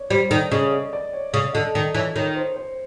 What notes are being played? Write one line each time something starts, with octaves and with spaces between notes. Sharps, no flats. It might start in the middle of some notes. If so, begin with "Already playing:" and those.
Already playing: C#5 D5
G3 C5
D#3 D5
C#3 D#5
D5
D5
C#5
C#3 D5
D3 D#5
D#3 D5
E3 C#5
D#3 C#5
C5
C5